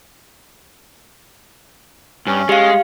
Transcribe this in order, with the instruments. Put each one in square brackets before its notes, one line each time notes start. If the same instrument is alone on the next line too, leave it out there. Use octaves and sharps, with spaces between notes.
[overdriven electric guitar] G2 [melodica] C#4
[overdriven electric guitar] G#3 [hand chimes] G4 F5